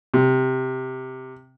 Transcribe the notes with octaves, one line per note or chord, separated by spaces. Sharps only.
C3